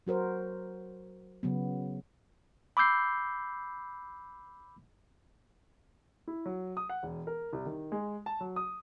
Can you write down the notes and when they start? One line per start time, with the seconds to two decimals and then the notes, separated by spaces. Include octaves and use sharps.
0.07 F#3 F#4 A#4 C5
1.43 C#3 F#3 B3
2.77 B5 D6 E6 G6 C7
6.27 E4
6.46 F#3
6.77 D#6
6.89 F#5
7.03 E1
7.27 A#4
7.53 C2
7.66 D#3
7.92 G#3
8.26 A5
8.41 F#3
8.56 D#6